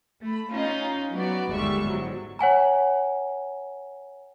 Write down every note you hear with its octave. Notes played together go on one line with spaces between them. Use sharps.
A3 B5
C#4 D#4 F4
F#3 B3 F#4 B4 D5
G1 D#2 G3 G#3 E5 C#6
G#2 F#3
C#5 F#5 G#5 A#5